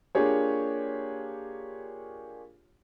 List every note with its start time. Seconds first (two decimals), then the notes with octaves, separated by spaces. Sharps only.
0.15 A#3 D4 F4 G4 G#4 C#5